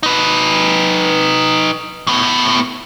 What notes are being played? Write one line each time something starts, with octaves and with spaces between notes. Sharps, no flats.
D#4 B4
A2 B3